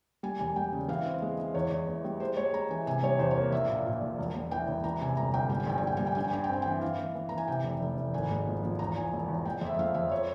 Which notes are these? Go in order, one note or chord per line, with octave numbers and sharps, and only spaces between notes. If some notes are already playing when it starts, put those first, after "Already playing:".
G3 G#5
E1 G#5
G3 G5
C#3
E3 F5
C4
G#3
G#3
E2 C#5
E2
E3
G3
G#3 C5
G#3 C#5
G#3 A#5
E3 G#5
C3 G#5
G3 C#5
E2 C5
C#5
A#3
A#1 E5
A#2 F5
A#2
A#1
E1
E1
E3 G5
E1
E3 A#5
C3 G#5
G1 A#5
G1 G5
G3 G5
G#5
A#1 G5
G#5
A#1 G5
G3 G#5
G5
G2 G#5
G5
G2 G#5
G5
C4 G#5
E3 G5
E3 F5
E3
E3
E3 A#5
G#5
C3 G5
F1
F1
F1
G#1 G#5
G#3
F3
F3
E2 A#5
E2 G#5
E1
E2
G#3 G5
F2
E5
F3 F5
F2 E5
C#5